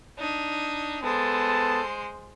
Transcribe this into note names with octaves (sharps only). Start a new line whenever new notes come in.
D4 D#4
G#3 B3 A4 C5 A5